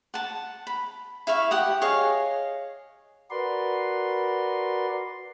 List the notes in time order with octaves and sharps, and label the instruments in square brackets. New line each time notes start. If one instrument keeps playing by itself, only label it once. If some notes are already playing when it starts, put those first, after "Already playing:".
[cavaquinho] F#5 A5
B5
E4 E5 F5 C#6
G4 F#5 D#6
G#4 C#5 D#5 F5
[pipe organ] F#4 A#4 B4 D5 C6